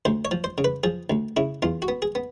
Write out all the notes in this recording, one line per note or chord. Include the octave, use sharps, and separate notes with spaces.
D2 C5
C#5
F3
C5
C#3
B4
F3 G#4
D2
C#3 E4
E2 F4
F#4
B3
G#4
B3